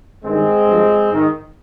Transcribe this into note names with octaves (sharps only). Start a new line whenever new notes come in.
G2 D#3 G#3 C4
G2 F3
G#2 D#3